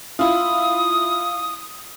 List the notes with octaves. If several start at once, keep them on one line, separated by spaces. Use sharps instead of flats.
E4 F4 D#6